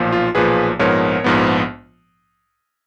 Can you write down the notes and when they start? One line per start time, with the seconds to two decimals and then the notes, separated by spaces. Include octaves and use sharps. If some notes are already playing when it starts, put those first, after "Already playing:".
Already playing: B1 A#2 F3
0.12 F4
0.35 B1 A#2 F3 G#4 B4
0.79 A#1 G#2 F3 B3 A#4 C#5
1.24 A#1 G#2 F3 B3